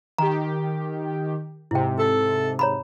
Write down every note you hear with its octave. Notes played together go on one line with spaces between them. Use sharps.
D#3 G4 A#5
G#2 C3 E4 G5
A4
C#5 A#5 B5